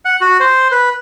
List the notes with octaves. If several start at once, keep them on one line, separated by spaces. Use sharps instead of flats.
F#5
F#4
C5
B4